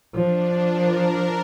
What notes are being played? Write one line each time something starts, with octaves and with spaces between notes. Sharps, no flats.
F3 D4
A#4